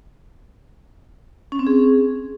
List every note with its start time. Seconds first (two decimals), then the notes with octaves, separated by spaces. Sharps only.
1.52 C#4
1.59 C4
1.67 G#4